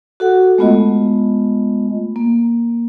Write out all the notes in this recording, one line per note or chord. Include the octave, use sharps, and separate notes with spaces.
F#4 A4 F#5
G#3 A3 B3 F4 D#5
A#3